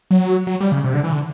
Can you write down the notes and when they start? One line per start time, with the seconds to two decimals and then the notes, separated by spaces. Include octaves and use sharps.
0.11 F#3
0.47 F#3
0.60 G3
0.72 C#3
0.84 C3
0.94 D3
1.04 E3
1.13 D3